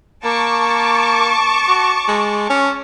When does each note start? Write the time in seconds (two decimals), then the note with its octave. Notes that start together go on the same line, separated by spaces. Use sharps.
0.24 A#3 A5 C#6 D6
1.68 F#4
2.08 G#3
2.50 C#4